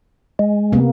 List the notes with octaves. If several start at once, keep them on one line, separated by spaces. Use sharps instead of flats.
G#3
C3 A#3 B3